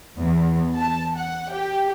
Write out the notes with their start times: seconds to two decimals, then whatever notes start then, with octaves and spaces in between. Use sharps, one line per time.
0.20 E2
0.77 A5
1.17 F#5
1.52 G4